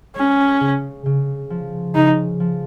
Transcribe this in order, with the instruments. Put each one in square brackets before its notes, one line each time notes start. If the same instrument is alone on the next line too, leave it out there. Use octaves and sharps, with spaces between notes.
[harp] G#3 [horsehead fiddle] C#4
[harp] C#3
C#3
F3
[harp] C#3 [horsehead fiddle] D#4
[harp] F3